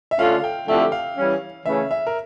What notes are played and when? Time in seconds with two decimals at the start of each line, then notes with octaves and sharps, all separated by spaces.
0.11 E5
0.19 D3 A3 C#4 F4 F5
0.44 G5
0.68 F2 D3 A3 E4 G4 G5
0.92 F5
1.17 E3 G3 C#4
1.65 C#3 E3 A3 C#4 E5
1.91 E5
2.07 A#4